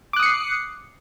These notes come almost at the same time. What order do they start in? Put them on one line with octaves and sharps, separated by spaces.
D6 F#6 D#6 C#7 C7